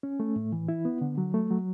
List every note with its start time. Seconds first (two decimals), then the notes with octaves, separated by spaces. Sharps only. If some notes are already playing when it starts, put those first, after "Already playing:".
0.03 C#4
0.20 A3
0.36 A2
0.52 E3
0.68 E4
0.85 B3
1.01 D3
1.18 F#3
1.34 A3
1.50 F#3